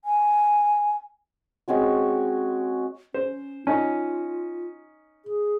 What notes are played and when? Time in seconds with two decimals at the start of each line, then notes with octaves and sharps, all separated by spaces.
0.05 G#5
1.68 G#3 C4 C#4 F#4
3.14 C#4 C5
3.67 C#4 D#4 F4
5.26 G#4